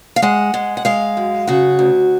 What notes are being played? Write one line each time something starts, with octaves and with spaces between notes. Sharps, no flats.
F5
G#3 F#5
G#3
F#5
G#3 F5
F#2
C#3 F#4
D2